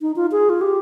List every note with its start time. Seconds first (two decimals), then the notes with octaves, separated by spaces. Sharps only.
0.02 D#4
0.16 F4
0.32 G#4
0.49 F4
0.61 G4